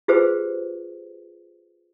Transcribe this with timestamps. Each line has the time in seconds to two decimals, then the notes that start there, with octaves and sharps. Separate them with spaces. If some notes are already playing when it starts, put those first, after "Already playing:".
0.08 F4 G4 G#4 B4 C5